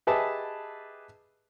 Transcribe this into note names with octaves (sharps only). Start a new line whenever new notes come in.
G4 G#4 B4 D#5 E5 A5